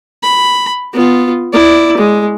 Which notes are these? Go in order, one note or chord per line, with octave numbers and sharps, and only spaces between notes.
B5
B3 F4
E4 D5
G#3